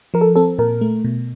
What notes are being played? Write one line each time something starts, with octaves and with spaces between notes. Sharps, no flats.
F3 A#4
A4
C4 A4
A#2 A#4
A3
B2